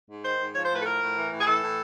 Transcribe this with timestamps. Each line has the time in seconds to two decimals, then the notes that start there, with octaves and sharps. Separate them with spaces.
0.09 G#2
0.24 D#3 C5
0.39 G#2
0.55 F3 C#5
0.65 C5
0.70 A2 B4
0.81 A4
0.85 F3 A#4
1.01 A2
1.16 E3
1.31 A2
1.40 G#4
1.46 E3 A4
1.62 A2